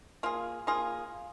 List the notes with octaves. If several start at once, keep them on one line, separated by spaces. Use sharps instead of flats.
A#3 F4 G#4
A#3 F4 G#4